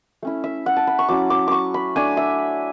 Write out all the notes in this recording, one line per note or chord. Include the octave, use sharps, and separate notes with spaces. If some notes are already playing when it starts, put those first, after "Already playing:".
A3 C#4 E4
E5
F#5
A5
B5
C#6
F#3 C#4 E4 D6
D6
C#6 D6
B5
A3 D4 G#5
E5